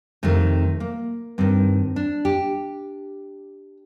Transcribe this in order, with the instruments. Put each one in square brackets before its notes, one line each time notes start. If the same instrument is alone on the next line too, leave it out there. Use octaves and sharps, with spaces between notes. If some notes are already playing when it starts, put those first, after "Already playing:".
[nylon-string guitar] F2 C3 D#3 A3
A#3
G2 D#3 C4
D4
G4